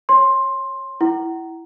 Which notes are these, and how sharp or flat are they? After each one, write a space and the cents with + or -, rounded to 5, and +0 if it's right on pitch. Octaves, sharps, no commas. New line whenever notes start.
C#5 -15 C6 +10
E4 +10 F#5 +35